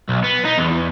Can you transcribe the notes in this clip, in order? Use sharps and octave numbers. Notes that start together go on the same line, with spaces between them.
B1
B3
D#4
E2